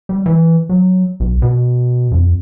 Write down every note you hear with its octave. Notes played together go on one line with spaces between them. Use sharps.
G3
E3
F#3
B1
B2
F2